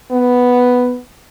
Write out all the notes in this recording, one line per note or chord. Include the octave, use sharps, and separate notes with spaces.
B3